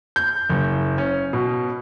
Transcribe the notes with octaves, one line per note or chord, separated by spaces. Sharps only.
G6
F#1
C#4
B2